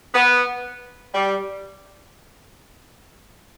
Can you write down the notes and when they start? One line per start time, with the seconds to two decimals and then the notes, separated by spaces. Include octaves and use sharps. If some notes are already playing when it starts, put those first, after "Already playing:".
0.14 B3
1.14 G3